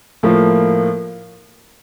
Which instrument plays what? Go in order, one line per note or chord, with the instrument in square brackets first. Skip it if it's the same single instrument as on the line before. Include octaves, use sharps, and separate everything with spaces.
[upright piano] A2 F3 A#3